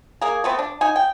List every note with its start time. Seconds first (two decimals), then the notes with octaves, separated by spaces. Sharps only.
0.21 A#3 G#4
0.44 A3 B3 C4
0.59 D4
0.81 D#4 G#5
0.96 G5